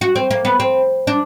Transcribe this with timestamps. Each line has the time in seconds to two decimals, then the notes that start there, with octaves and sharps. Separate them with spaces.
0.01 F#4
0.16 C4
0.31 A#3
0.45 B3
0.60 C4
1.07 D4